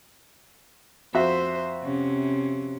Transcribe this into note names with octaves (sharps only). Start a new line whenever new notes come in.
F2 F#4 C5 E5
C3 C#4